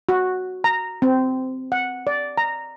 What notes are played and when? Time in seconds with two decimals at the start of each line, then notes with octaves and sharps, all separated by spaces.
0.09 F#4
0.64 A#5
1.02 C4
1.72 F#5
2.07 D5
2.38 A#5